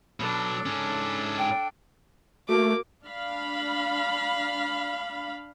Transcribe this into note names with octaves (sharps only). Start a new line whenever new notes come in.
B2 F#3 D4 A4
G#2 C#4
G5
A3 A#3 F#4 D6
D4 F5 B5